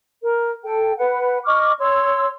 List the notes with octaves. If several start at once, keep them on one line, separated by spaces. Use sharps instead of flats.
A#4
A4 G5
B4 F#5
D#5 C#6 D6 F6
C#5 C6 E6